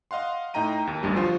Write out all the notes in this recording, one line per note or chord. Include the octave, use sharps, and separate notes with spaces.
D#5 F5 F#5 C6
A2 D#4 D#5 G5 A#5 D#7
D#2
A1 D2 G2 G3
F3 F4 F#4 C5